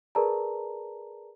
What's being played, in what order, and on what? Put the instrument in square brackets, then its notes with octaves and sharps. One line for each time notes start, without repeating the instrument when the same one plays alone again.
[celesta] G#4 A#4 B4 D5 A5 A#5